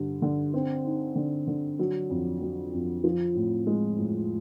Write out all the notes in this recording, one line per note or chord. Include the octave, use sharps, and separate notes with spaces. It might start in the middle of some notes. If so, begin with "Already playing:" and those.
Already playing: G2 D3
D3
C4
D#4
D3
D3
F#3
F2
F#3
F2
F3
A2
G#3
A2